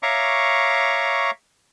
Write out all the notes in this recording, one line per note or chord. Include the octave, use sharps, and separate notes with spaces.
C#5 E5 F5 A#5 C#6 D6